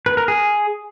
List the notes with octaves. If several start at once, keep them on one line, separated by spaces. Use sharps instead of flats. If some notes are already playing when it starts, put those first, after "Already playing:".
B4
A#4
G#4